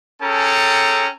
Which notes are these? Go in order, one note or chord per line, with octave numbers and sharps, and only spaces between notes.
C#4 G#4 A4 G5 A5 A#5